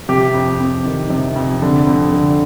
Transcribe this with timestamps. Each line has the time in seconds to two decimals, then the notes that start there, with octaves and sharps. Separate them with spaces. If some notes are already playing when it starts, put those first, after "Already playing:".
0.09 C3 G4
0.34 F2
0.60 F2
0.85 D#3
1.10 C3
1.36 F2
1.62 D3
1.87 F2
2.13 D3